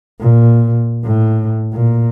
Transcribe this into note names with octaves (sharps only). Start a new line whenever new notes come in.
A#2
A2
A#2